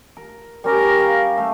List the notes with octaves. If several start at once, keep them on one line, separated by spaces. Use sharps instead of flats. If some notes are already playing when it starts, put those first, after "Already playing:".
A#4
G3 C#4 G4 A#4
F5 G5 A#5
A3 E5